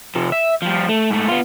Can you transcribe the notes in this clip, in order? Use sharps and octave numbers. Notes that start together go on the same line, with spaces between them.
C3 F3
E5
F3 G3
A3
G#2 A3
B3 F4